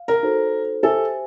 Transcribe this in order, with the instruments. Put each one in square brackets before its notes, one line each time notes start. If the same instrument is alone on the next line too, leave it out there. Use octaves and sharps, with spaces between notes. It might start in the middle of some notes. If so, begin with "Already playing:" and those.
Already playing: [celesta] F5
[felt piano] A#4
[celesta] D#4 F#4 A4 C5
[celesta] G4 C5 E5 G#5 [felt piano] A4